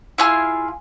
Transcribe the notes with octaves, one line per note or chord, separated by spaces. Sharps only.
E4 F4 G#4